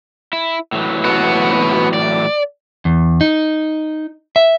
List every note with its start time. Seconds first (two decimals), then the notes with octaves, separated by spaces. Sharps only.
0.33 E4
0.72 A2 E3 F#3
1.04 B3 F#4
1.93 D5
2.85 E2
3.21 D#4
4.36 E5